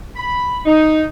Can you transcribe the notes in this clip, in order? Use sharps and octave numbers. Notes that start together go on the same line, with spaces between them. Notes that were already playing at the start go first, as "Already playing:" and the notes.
B5
D#4